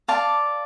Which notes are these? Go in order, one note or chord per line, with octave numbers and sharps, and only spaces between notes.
D5 F5 A5